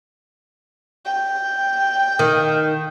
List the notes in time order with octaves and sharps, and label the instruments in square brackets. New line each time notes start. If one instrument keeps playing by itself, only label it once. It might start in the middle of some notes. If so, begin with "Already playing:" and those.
[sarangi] G5
[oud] D#3